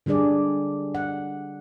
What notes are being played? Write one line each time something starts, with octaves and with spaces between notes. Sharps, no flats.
D3 G3 D4 G#4 D5
F#5